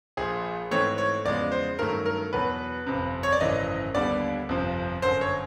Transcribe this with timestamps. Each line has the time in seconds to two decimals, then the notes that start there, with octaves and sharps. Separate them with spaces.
0.17 A#1 A#2 F3 G#4
0.71 G#2 E3 A3 C4 C#5
0.98 C#5
1.25 E2 C#3 F3 G#3 B3 D5
1.52 C5
1.79 G2 D#3 F#3 A3 C#4 A#4
2.06 A#4
2.33 E2 B2 F#3 B4
2.87 G1 F2 C3
3.23 C#5
3.32 D5
3.40 G#1 F#2 C#3 E3 D#5
3.94 D#2 D3 G3 B3 D4 D5
4.49 G1 F2 C3 F3
5.02 G1 F#2 D3 C5
5.21 C#5